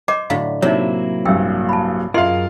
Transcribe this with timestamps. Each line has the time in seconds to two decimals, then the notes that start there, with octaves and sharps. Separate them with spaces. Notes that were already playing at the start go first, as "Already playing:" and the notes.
0.08 C5 D#5 F#5 D6
0.30 A2 D3 F#3 F5
0.62 C3 F#3 A#3 D#4 E4 C#5
1.26 A#1 G2 G5 E6
1.69 A5 B5
2.14 F#2 F4 G#4 A#4 D#5 F5 F#5 C6